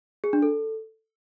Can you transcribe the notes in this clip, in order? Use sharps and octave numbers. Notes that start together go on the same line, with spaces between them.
G#4
D4
A4